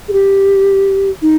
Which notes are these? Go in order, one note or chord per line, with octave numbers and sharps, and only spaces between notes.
G#4
G4
D#4